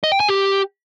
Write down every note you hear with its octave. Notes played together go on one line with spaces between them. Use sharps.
D#5
G5
G#5
G4